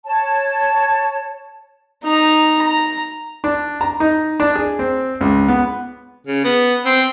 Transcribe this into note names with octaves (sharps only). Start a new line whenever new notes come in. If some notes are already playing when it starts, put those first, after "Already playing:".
C#5 A5
D#4 A#5
A#5
D4
A#5
D#4
D4
G#4
C4
C#2
B3
C#3
B3
C4